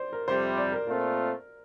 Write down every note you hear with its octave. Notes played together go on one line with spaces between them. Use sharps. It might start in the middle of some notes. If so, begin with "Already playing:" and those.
Already playing: C5 D5
A#4
F2 C3 G3 C5
D5
A#4
A#2 A3 C4 F4 A#4